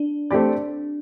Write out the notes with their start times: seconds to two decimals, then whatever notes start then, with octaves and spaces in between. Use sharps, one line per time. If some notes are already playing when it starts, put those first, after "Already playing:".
Already playing: D4
0.31 A3 C4 G4 D5